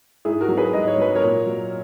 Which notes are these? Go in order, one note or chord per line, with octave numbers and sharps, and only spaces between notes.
G#2 E4 G#4
F#4 A#4
F#3
G#4 B4
G#2 D#5
C#5
F#3 B4
A#4 C#5
A#2
F#3